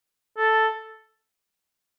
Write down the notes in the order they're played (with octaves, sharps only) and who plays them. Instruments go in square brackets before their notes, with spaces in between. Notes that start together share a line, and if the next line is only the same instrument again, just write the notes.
[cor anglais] A4